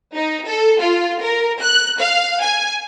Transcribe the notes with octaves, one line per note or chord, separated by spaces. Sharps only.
D#4
A4
F4
A#4
F#6
F5
G#5